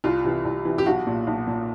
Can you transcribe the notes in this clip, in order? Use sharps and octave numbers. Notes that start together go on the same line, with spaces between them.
C2 F4
C3 E3
C2
C3 E3
G4
B1 F#4
A#2
B1
A#2